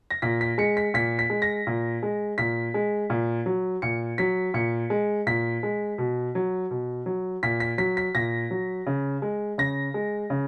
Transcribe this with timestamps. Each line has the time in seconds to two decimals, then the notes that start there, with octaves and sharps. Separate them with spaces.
0.10 A#6
0.22 A#2 B6
0.41 B6
0.58 G#3 C#7
0.77 B6
0.94 A#2 B6
1.19 B6
1.30 G#3
1.42 A#6
1.67 A#2
2.03 G#3
2.38 A#2 B6
2.74 G#3
3.10 A#2
3.46 F#3
3.82 A#2 C#7
4.18 F#3 B6
4.54 A#2 C#7
4.90 G#3
5.27 A#2 B6
5.63 G#3
5.98 B2
6.35 F#3
6.71 B2
7.06 F#3
7.43 A#2 B6
7.60 B6
7.78 F#3 B6
7.97 B6
8.15 A#2 A#6
8.51 F#3
8.87 C#3
9.22 G#3
9.58 C#3 A#6
9.94 G#3
10.30 C#3